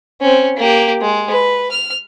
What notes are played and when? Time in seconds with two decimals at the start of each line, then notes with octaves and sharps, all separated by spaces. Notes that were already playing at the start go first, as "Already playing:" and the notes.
0.21 C4 C#4
0.57 A#3 G4
1.01 G#3
1.31 B4
1.71 F6